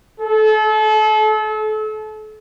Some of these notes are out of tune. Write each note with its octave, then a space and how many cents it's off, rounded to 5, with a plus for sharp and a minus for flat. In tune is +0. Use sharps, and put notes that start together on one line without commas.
A4 -35